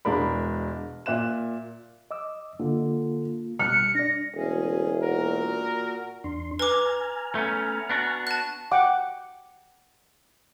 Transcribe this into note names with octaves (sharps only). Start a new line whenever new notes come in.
E1 G#3 D4 A#4 B5
A#2 E5 F#6 E7
D#5 D6 E6
D3 A#3 F4
B2 G3 F6 F#6 C#7
D4 D5 A#6
E1 D2 C#4 G#4
A#2 F#4 A#4
E2 D4 C6
B4 G#5 A#5 D6 F6
A3 B3 C#4
B3 D4 F#4
A5 F#6
F#5 G5 D6